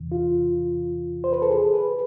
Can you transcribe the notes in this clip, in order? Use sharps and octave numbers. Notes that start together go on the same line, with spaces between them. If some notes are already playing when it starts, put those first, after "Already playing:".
Already playing: E2 C3 E3
F4
C5
B4
A4
G#4
B4